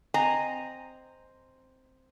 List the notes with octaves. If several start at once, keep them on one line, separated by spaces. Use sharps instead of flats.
C4 D#5 G#5 A#5